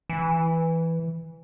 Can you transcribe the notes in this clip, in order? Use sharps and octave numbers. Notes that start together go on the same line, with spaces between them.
E3